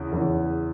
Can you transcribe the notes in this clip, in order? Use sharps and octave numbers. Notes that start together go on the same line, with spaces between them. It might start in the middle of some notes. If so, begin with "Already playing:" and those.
Already playing: E2 C#3 E3 C#4
E2 C#3 E3 C#4